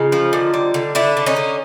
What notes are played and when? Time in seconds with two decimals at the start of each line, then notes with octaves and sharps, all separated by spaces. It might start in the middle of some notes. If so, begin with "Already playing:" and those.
Already playing: C#3 D#4 F4
0.12 F3
0.33 D3
0.54 G3
0.74 D3
0.95 D3 D4 E4
1.17 D3
1.26 C#4 D#4
1.36 D3